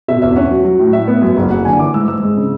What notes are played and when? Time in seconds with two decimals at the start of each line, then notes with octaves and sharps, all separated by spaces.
0.08 B2 E5
0.22 E2 E5
0.36 C#4 F#5
0.51 F#3
0.65 F#3
0.79 A2
0.93 A2 E5
1.08 B3
1.22 F#2
1.36 F#1
1.51 F#1 F#5
1.65 D3 G#5
1.79 E3 D6
1.94 G#2 E6
2.08 G#2 E6
2.23 G#3
2.37 C#3